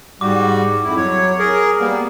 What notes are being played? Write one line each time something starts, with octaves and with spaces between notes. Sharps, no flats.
G#2 G3 F#4 D6
F2 E4
F#3 C#5
G#4 A#4
G3 A#3 B3